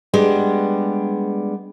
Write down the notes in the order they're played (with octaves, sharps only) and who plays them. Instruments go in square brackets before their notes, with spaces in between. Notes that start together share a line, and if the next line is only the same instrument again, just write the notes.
[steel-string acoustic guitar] G3 G#3 B3 D4